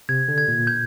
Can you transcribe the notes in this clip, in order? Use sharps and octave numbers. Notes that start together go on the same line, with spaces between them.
C3 G#6
D3
G#6
A#2
G6